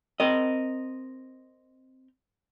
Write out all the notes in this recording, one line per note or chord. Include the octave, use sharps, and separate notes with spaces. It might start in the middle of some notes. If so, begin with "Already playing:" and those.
C4 A#4 D#5